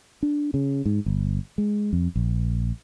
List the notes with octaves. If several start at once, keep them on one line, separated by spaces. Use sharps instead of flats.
D4
C#3
G#2
G1
G#3
F2
A#1